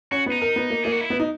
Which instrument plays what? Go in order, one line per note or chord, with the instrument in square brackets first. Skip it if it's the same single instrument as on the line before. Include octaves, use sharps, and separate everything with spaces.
[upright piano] C#4 [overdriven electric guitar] F#4
[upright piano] B3
[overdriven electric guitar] D#4
[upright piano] A#4
B3
A#3
[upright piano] A#3 [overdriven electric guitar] G#4
[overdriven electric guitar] F#4
E4
[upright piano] B3
D#4